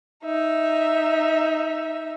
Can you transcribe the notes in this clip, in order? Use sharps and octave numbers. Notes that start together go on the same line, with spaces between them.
D#4 E5